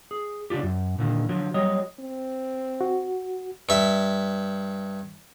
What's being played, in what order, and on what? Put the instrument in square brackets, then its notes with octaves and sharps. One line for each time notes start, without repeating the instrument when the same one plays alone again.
[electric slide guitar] G#4
C#3 D4 F4 G4
F#2
A#2 D3 D#3
D3 F3 F#3
F#3 G3 C#5 D#5
[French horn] C4
[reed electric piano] F#4
[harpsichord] G2 E5